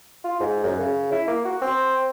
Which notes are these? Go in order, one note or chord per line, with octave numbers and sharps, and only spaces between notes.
F4
G#2
F#2
C#3
E4
A#3
F#4
C4